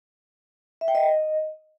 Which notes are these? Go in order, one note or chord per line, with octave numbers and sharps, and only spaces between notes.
E5
G5
D#5